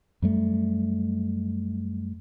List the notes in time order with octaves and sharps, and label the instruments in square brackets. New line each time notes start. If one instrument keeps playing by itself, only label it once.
[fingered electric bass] F#2 G3 A3